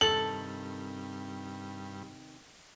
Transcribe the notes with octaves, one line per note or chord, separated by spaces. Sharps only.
G2 C3 D#3 A4 F#7